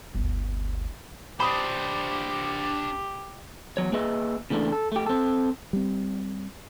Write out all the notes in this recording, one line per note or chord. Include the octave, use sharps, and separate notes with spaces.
G1 D2
D4 G4 C5 B5 D#6
E2 F#3 C#5
A#3 G#4 B4 D#5 E5
C#3 E3 A3 A#3 D4
A4
A3 G4
C4 A4
G3 C4